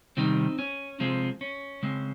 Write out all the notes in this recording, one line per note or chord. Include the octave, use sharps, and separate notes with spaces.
C3 D#3 G3 C4 D#4
C#4
C3 F3 G#3 C4
C#4
C#3 G#3 C4